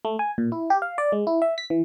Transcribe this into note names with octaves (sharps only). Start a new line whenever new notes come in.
A3
G#5
A#2
E4
G4
F5
D5
G#3
E4
E5
B6
E3